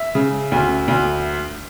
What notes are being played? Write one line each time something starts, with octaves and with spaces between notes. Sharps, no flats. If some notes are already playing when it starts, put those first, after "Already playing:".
Already playing: E5
C#3
D2
D2